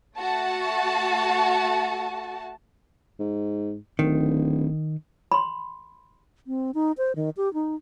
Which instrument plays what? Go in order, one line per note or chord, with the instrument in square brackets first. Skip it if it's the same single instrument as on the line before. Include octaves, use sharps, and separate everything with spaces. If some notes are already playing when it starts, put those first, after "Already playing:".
[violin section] A3 F#4 A5
[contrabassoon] G#2
[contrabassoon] D1 [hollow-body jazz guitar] D#3
[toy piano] B5 C6
[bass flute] C4
D#4
C5
D#3
G4
D#4